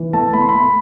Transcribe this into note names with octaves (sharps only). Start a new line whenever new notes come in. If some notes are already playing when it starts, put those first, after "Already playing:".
Already playing: E3
A3 A5
A3 B5
C6
B5
A3